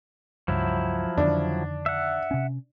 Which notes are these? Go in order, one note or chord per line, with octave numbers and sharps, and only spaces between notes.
C#2 G2 F3 F#3 E4
F2 D3 D#3 D4
E5 F#5
C3 C#4